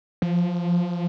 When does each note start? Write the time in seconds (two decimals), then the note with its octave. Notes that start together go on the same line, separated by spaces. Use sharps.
0.22 F3